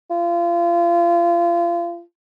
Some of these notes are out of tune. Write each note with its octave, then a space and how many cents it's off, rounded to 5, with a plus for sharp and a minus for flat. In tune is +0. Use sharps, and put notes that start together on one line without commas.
F4 -30